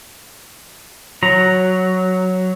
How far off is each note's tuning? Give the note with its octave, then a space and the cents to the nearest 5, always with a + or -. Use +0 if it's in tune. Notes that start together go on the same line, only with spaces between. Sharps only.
F#3 +0 A#5 +0